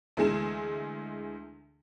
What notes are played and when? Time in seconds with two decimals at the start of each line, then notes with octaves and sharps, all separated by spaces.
0.17 D2 E3 G#3 G#4 E7